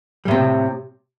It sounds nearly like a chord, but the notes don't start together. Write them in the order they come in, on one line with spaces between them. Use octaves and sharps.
G3 A2 C3